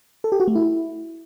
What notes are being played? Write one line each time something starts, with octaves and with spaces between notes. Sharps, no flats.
A4
G4
F#4
A3
E4